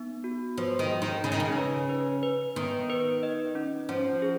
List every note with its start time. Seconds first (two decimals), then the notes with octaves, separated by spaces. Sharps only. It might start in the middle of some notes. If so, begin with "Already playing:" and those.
Already playing: B3 D#4
0.24 F#4
0.58 F3 B4
0.79 D#3
0.90 G#4
1.02 D#3
1.24 C#3 D#4
1.32 D#3
1.40 C#3
1.57 B4
1.89 B4
2.23 B4
2.56 D#3 B3
2.90 B4
3.23 D#5
3.55 C#4
3.89 F3 C#4
4.22 G#4